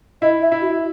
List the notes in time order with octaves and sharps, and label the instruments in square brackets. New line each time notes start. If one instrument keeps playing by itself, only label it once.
[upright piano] E4 [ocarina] D#5
[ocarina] E5
[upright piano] E4
[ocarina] F#4